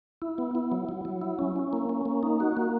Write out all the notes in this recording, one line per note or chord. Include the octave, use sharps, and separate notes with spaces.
E4
B3
E4
F#3
F#3
F#3
E4
C#4
C#4
A#3
C#4
A#3
D#4
F#4
A#3